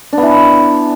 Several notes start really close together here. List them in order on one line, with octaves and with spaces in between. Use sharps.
D4 B3 E3